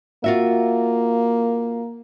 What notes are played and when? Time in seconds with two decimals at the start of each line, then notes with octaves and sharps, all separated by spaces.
0.24 A#3 F4 F#4 E5